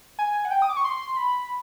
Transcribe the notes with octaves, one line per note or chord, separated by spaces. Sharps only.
G#5
F#5
G5
D#6
D6
C#6
C6
B5